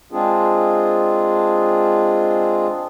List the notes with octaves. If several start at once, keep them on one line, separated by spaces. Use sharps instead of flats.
G#3 C4 D4 F4 G#4